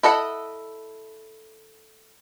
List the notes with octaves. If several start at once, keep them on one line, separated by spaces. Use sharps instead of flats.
E4 A4 D#5 F#5